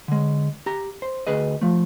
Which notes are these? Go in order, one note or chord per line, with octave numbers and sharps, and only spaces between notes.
D3 G#3
G4 A#5
C5
D2 G#4 B4 D#5
F3 A3